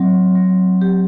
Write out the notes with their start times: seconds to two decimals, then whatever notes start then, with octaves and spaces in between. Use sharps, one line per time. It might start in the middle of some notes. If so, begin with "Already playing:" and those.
Already playing: F#3 C4
0.35 F#3
0.82 G4